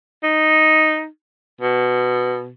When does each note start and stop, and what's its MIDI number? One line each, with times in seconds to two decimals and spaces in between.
0.23 1.07 63
1.61 2.51 47